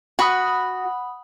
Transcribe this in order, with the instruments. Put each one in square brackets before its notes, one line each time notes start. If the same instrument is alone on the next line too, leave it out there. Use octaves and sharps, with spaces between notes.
[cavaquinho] F#4 [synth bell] F#5 B5 D#6